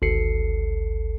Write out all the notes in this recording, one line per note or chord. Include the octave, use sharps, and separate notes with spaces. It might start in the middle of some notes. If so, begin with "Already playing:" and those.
G#1 D2 A4 C7 C#7